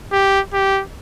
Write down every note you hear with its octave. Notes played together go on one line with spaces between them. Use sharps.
G4
G4